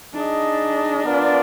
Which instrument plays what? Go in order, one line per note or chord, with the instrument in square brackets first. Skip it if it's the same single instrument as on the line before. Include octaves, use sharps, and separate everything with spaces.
[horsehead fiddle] D4 [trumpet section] D#4 G#4 D#5
[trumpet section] B3 F4 A#4 D5